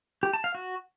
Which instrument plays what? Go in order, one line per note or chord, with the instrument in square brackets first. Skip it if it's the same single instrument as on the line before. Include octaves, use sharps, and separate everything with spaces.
[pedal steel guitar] G4
A5
F5
F#4